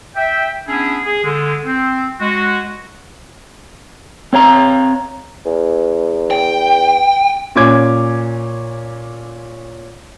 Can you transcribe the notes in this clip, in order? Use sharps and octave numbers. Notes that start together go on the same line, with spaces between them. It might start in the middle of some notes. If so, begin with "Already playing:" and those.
E5 G5
B3 C#4 D4 E4 G#4
G#4
D3 G#3
C4
G#3 F#4
C4 C#5 F5 A#5
E2
G5
A#2 C#4 D6 G#6